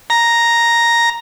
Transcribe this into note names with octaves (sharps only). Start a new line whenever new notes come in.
A#5